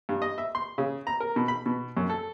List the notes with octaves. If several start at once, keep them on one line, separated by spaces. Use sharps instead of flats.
G2
D#5
E5
C6
C#3
A#5
A#4
B2
B5
B2
F#2
A4